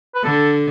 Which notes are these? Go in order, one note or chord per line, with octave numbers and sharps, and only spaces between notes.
B4
D3 A4